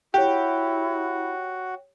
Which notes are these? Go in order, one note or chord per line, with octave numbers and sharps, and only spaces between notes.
E4 F#4 G4 C#5 F#5 G5